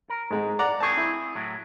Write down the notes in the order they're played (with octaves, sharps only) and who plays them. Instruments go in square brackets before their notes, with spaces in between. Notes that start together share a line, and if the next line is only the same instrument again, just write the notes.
[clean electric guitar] A#4
[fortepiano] G#2 G#3
D5 F#5 A#5
[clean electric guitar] C4 G#4 [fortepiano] A5 C#6
[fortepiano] E4
[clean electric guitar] A2 F#3